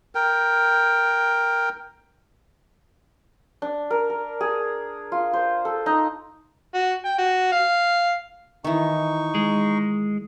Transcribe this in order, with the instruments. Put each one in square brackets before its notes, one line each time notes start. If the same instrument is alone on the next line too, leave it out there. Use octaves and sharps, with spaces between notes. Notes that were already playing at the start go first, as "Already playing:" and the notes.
[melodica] A#4 G5
[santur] D4
A#4
A#4
G#4
F4
C5
A4
D#4
[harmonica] F#4
G5
F#4
F5
[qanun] D#3 E3 [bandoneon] D#4 C#6
[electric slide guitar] G#3